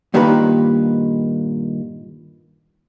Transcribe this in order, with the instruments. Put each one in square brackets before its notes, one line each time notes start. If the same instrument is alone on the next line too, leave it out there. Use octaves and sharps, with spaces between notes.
[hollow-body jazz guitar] G2 A#2 D#3 G4 B4 A#5